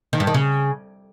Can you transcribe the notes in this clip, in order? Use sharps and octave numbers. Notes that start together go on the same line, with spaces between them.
D#3
G2
D#3
C#3